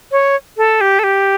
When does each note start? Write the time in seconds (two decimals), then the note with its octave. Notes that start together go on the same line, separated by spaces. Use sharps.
0.12 C#5
0.57 A4
0.81 G4
0.99 A4
1.04 G4